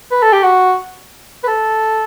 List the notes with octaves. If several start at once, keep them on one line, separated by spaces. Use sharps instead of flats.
B4
A4
G4
F#4
B4
A4